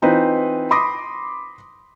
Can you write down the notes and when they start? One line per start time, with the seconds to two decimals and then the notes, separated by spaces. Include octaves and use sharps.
0.02 E3 C4 D#4 F4 B4
0.71 B5 C6 D6 D#6 A#6